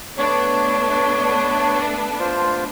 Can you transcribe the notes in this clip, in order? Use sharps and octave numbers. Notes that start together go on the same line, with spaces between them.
A3 B3 D4 C#5
F4 C5